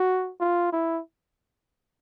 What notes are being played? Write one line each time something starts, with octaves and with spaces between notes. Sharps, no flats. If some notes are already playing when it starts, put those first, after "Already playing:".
Already playing: F#4
F4
E4